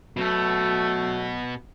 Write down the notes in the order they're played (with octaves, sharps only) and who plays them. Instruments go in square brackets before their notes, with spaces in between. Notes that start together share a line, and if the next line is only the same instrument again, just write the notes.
[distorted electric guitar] B2 B3 [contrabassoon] F#3 [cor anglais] A3